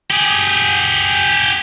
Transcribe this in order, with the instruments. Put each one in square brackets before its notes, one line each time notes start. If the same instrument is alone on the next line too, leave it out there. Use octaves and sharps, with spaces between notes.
[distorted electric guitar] G4 G#4